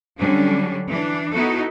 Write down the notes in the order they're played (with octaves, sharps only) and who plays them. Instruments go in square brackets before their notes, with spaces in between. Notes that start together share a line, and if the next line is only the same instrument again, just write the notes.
[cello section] D3 F#3 G3 C#4 D4
E3 D4
B3 D#4 E4 F#4 A4